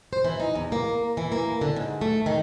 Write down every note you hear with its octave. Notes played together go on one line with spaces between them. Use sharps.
C5
E3
D#4
E2
A#3
E3
A#3
D3
G#2
A3
D#3